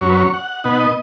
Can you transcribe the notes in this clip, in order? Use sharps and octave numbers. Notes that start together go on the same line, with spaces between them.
F#2 F#3 C#4 C#5
B4
C#5
F#5
B2 B3 D#4 F#5
D#5